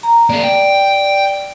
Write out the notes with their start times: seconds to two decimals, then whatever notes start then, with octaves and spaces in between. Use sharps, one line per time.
0.03 A#5
0.30 A#3 G#4 D5
0.44 G5